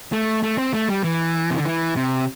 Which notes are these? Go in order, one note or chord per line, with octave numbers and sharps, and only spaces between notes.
A3
A3
C4
A3
G3
E3
C3
D3
E3
C3